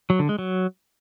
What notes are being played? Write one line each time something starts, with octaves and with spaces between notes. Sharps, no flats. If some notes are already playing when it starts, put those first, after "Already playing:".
F#3
D3
G#3
F#3